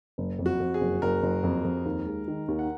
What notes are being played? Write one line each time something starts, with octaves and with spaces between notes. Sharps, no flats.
F#1
F2
F#4
F2
G#4
F#1
F#1 A#4
F#1
F2
F2
D#2
G#3
D#3
D#2
F#5